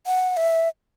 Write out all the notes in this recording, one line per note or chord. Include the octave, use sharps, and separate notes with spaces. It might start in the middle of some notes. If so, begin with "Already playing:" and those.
F#5
E5